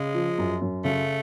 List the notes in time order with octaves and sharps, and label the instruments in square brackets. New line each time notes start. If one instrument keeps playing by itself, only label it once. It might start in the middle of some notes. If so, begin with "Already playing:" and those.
Already playing: [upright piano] C#3 [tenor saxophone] G#3
[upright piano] F3
F#2
F#2
[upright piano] C#3 [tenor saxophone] A3